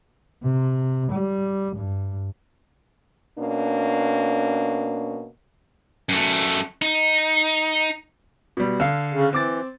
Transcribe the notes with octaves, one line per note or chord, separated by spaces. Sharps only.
C3
G3
G2
B2 A#3 C#4 D4
F#2 A3
D#4
B2 G3
D3 F5
C#3
E3 C4 D6 A6